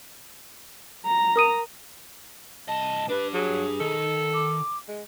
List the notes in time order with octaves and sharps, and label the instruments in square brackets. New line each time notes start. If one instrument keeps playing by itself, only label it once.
[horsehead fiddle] A#5
[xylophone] A#4 D#6 D#7
[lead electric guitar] C2 D#5 [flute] A5
[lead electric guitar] D4 G4 [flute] B4
[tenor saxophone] F#3 [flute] G#4
[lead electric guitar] D#3 [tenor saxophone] A4
[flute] D6
[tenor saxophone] G#3